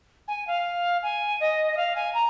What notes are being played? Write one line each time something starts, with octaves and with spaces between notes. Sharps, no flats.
G#5
F5
G#5
D#5
D#5
F5
G#5
A#5